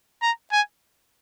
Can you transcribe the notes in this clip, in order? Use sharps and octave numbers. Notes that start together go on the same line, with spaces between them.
A#5
G#5